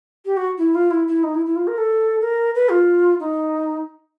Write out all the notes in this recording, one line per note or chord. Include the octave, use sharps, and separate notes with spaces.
G4
F#4
E4
F4
E4
E4
D#4
E4
E4
F4
A#4
A4
A#4
B4
F4
D#4